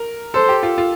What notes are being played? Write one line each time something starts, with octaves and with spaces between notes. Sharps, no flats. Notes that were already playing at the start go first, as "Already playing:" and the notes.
Already playing: A#4
A4 C5
G4
F4
F4